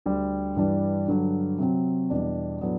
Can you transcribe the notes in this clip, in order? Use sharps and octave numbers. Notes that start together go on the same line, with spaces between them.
D2 D3 G3
G2 E3 G3 D4
G2 D3 F#3
C3 F#3 C4
E2 B2 G3 D4
A2 F#3 B3 D4